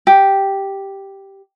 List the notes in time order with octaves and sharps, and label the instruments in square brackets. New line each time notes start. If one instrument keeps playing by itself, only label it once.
[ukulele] G4